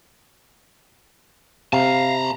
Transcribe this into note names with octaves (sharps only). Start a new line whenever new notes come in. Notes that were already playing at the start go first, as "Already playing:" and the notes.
C3 F5 A5 A#5